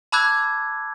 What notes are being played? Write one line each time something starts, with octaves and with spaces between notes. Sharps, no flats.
A5 B5 D6 E6 F#6 G#6